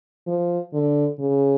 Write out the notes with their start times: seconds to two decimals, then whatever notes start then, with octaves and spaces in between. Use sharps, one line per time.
0.27 F3
0.73 D3
1.19 C#3